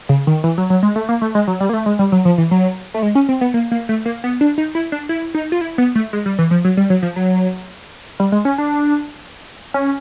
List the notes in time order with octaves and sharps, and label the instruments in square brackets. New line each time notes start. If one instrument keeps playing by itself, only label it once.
[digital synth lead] C#3
D#3
E3
F#3
F#3
G#3
A3
A#3
A3
G#3
F#3
G3
A#3
A3
G#3
G3
F#3
F3
E3
F#3
A3
G#3
C#4
C4
B3
A#3
A#3
A3
A#3
B3
D4
D#4
E4
D4
E4
D#4
F4
E4
B3
A3
G#3
G3
E3
F3
F#3
G3
F#3
F3
F#3
G3
G#3
C#4
D4
C#4